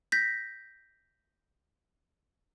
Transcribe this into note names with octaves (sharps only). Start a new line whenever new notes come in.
G6 A#6 B6